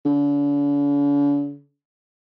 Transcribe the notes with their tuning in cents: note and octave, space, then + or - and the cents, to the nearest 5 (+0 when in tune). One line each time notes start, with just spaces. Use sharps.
D3 -45